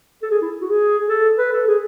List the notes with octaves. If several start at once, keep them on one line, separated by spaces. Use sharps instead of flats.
A4
G#4
E4
F#4
G#4
A4
B4
A4
G#4